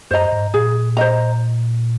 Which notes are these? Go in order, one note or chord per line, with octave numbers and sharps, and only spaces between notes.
F#2 C5 D#5 A#5
G#2
A#2 G#4
C5 D#5 A#5